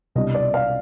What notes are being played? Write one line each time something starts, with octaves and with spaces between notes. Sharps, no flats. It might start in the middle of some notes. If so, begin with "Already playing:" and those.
C2 B2 G3 D4 D#5
D5
F5